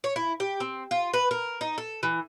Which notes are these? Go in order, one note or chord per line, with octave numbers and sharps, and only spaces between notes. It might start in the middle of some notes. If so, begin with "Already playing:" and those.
C#5
E4
G4
C4
F4
B4
A#4
D#4
A4
E3